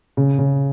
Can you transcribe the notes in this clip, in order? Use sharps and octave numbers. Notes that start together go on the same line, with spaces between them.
C#3
C#3